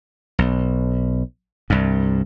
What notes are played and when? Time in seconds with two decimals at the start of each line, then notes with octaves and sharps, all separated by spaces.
0.39 B1
1.70 C2 G2